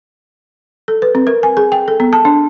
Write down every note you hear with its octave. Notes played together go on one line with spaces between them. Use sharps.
A4
B4
C4
A#4
G#5
G#4
G5
A4
B3
A5
D4